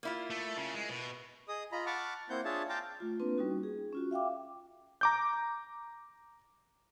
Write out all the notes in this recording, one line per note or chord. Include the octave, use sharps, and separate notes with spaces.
A#3 E4 F4
A3
C#3
G#3
B2
G#4 D#5 D#6
F4 D#5 A#5 B5
F#5 A5 B5 C#6 D6 F6
A#3 C4 E4 C5 F#5 G6
D4 F4 G#4 C#5 E5 A5
F5 G5 A5 A#5 C6 D6
A3 F4
A#3 C4 D4 F4 B4
G3 C#4 D#4 F#4
G#4
C#4 F4 F#4
E5 F5 G5 D6
A#5 D6 G6